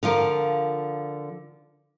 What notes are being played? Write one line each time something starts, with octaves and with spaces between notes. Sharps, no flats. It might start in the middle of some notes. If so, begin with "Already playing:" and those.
D3 F3 F4 A#4